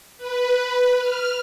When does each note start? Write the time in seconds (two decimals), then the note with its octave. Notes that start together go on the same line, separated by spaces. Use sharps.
0.18 B4
0.98 F6